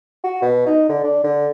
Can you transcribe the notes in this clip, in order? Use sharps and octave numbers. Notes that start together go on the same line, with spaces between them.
F#4
B2
D#4
D3
D4
D3